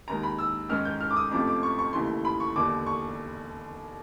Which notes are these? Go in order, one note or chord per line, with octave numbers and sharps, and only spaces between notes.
D#2 D#3 G#3 A#5
B5
E6
G#2 D#3 G#3 C#4 F6
G6
F6
D6
D#6
F2 C3 F3 A3 C#4 D6
D6
C#6
C#6
D#2 C#3 E3 A3 C6
B5
C#6
E1 D#2 D3 D6
C#6